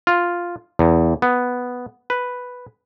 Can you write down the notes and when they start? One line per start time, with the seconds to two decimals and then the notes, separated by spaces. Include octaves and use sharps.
0.07 F4
0.79 E2
1.22 B3
2.10 B4